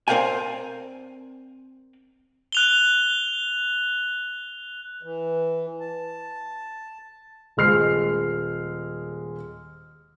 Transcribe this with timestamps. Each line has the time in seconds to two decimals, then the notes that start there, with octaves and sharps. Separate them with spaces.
0.08 C4 A#4 D5 F5 G5 G#5
2.52 F#6 F7 G7
5.03 E3
5.80 A5
7.57 D#1 G#3 F6 C7